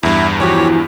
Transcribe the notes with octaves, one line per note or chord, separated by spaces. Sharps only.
E2 G2 E4
E3 F3 F#4 G4 C#5